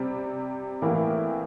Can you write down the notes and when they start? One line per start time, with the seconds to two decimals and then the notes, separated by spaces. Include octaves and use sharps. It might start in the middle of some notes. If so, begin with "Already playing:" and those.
Already playing: C3 G3 C4
0.82 A2 E3 A#3 E4